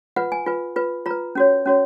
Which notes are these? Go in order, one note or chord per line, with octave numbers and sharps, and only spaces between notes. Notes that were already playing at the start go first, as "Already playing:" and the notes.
F4 B4 F#5
G#5
F4 B4
F4 B4
F4 B4 A#5
C#4 F#4 C#5
C#4 F#4 C#5